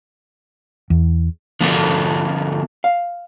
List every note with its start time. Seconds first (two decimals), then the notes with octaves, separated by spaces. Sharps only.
0.90 E2
1.61 D3 F3 B3 F4 A4 A#4
2.84 F5